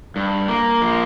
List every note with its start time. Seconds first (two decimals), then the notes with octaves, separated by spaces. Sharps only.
0.16 G2
0.48 A#3
0.82 F3